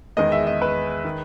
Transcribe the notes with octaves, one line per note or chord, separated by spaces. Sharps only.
E2 D#3 G#3 B3 D#5
E5
D#5
B4
D#3